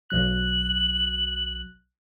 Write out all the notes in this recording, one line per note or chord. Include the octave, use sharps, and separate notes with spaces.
B1 F#3 F#6 F#7